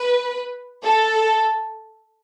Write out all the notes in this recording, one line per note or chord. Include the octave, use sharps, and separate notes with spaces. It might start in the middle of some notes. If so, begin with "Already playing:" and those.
Already playing: B4
A4